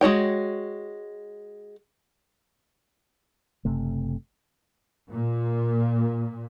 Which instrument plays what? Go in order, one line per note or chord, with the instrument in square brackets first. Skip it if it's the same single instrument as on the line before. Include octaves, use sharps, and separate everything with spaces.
[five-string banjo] G#3 F#4 C#5 G5
[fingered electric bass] F#1 C3 A3
[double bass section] A#2